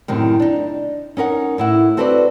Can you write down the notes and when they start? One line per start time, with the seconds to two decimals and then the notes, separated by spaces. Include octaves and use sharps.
0.08 F#2 A2 C3 D#3
0.40 D4 D#4
1.17 C#4 D#4 A#4 F#5
1.58 A2 E4 F#5
1.97 C4 F#4 A4 B4 C5 D5